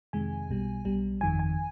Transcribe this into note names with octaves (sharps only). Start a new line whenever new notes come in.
F2 C3 D#3 G#3 G#5
B1 B2 G3
B1 B2 G3
G1 F2 D#3 G#5
G#5